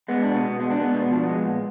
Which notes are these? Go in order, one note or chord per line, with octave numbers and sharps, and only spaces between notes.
G#3 B3
B2 D4
B3
B2
G#3 B3
D4
G#3 B3
B2 D4
B3
F3 D4
G#3 B3
A#2